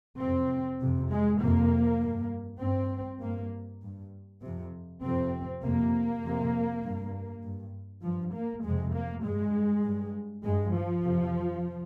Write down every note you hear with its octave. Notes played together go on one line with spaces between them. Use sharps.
F2 C3 C4
F2 C3
G#3
F2 C3 A#3
G2
G2 C4
G2 A#3
G2
F2 C3
F2 C3 C4
F2 C3 A#3
F2 C3
G2
G2
G2 F3
A#3
F2 C3 G#3
A#3
G2 G#3
G2
G2 G#3
F3
F2 C3